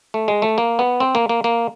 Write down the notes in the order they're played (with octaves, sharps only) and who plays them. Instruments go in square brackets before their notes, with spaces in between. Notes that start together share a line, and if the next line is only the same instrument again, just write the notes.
[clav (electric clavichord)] A3
G#3
A3
A#3
B3
C4
A#3
A#3
A#3